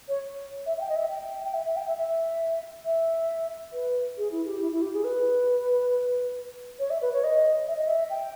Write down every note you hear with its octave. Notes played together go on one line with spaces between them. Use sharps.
C#5
E5
E5
G5
D#5
E5
G5
G5
E5
E5
G5
E5
E5
E5
B4
G#4
E4
G4
E4
E4
G4
G#4
B4
C#5
E5
B4
C#5
D#5
E5
D#5
E5
G5